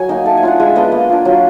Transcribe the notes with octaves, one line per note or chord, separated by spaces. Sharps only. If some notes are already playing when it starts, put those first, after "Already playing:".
Already playing: F#3 G#5
A#3 D#4
A3 A5
G#5
D4 F4 F#5
G#3 E5
B3 D4 F4 D#5
A#3
D4 F4
F#3